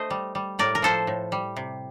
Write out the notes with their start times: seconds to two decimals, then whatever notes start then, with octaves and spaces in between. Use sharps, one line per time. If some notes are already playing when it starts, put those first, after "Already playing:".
Already playing: A3 C5 D#5
0.10 G3
0.35 G3
0.59 A2 A#4 D5
0.75 A#4
0.82 F3 A4 C5
1.07 A2
1.32 G3
1.57 C3